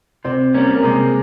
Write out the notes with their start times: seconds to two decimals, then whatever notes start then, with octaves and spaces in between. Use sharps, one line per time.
0.24 C3 C4 C5
0.54 G3 A#3 C#4 A#4
0.74 A#4
0.83 C3 G#3 G#4